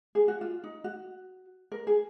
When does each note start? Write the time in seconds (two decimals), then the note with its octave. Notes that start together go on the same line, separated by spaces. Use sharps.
0.15 G#4
0.28 F#4
0.41 F4
0.64 D#4
0.84 F#4
1.72 A#4
1.87 G#4